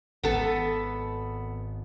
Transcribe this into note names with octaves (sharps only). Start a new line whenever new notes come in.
G#1 B3 A4